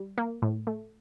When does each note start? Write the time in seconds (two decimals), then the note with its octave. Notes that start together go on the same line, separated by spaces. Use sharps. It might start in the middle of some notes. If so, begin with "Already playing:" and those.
Already playing: G3
0.18 A#3
0.42 A2
0.67 A3